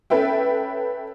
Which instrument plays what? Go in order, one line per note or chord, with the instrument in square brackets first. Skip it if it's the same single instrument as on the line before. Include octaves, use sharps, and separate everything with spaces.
[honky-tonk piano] C#4 A4 B4 E5 G5